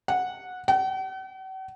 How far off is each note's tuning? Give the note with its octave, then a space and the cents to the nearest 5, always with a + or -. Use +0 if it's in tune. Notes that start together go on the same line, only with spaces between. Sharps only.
F#5 -15
F#5 +45